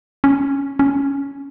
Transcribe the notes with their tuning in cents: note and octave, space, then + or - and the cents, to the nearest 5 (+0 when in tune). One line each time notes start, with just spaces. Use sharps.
C#4 +0
C#4 +5